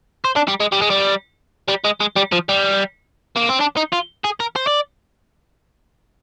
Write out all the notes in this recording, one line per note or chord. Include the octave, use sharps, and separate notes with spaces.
C5
D4
G3
G#3
G3
G#3
G3
G3
G#3
G#3
G3
F3
G3
A#3
C4
D4
D#4
F4
G#4
A#4
C5
D5